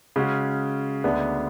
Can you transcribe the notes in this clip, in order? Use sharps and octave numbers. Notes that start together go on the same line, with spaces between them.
C#3 G#3 C#4 F#4
D2 D3 G#3 B3 D4